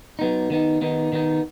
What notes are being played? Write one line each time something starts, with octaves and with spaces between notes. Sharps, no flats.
F#3 B3 D#4
D#3 B3 D#4
D#3 B3 D#4
D#3 B3 D#4